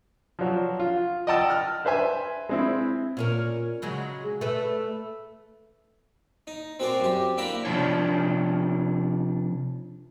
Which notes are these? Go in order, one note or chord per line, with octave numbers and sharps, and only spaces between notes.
F3 F#3
F4
D#5 F#5 G5 A5 D#6 E6
F6
B4 C5 E5 G#5
G#3 C4 E4
A#2 C#4 A#4
C#3 F#3 G#3
A3 B4
D#4
C4 F#4 G#4 A#4 C5 D5
F#2 G4
D3 A#3 E4 G5 A#5 B5
C3 F3 D4 C#5